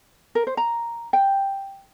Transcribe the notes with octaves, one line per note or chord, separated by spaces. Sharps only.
A#4
C5
A#5
G5